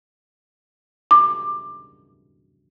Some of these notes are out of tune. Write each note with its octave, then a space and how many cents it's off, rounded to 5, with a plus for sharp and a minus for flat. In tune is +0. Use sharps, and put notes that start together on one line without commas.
D6 +15